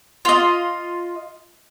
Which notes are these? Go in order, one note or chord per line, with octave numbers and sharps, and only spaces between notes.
F4 D#5